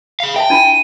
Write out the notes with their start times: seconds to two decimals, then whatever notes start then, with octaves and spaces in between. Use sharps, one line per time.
0.20 G#4 F5
0.36 E5 G5 A5
0.50 D4 E4 F4 D#7